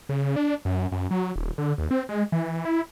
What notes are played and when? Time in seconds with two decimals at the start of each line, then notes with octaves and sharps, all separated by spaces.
0.09 C#3
0.36 D4
0.65 F#2
0.92 F#2
1.11 F#3
1.36 D#1
1.58 D3
1.78 D#2
1.91 C4
2.09 G#3
2.32 E3
2.65 E4